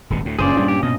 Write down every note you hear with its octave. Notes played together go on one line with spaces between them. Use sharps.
D#1 G#1 B2
D2 A2
F#1 G2 A#2 C#4 G#4 C5 D5
G3 D4
G4
B2 D#5